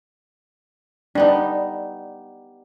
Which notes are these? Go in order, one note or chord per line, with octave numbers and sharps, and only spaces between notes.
G3 B3 D4 D#4